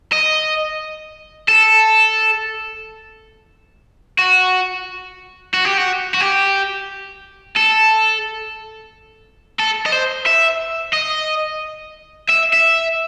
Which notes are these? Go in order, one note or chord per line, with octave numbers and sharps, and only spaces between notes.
D#5
A4
F#4
F#4
G4
F#4
F#4
G4
A4
A4
D#5
C5
E5
D#5
E5
E5